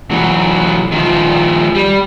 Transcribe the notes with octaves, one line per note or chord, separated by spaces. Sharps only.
E3 F#3
D#3 F3
G3